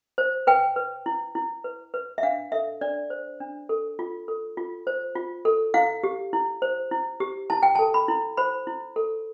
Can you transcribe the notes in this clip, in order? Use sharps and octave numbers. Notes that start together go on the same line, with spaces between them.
C5
B4 G5
B4
E4
E4
B4
B4
E5
D4 F5
A4 E5
D4 D5
C5
D4
A4
F4
A4
F4
C5
F4
A4
E4 F5
G4
E4
C5
E4
G4
E4 A5
G5
A4 A5
B5
E4
C5 B5
E4
A4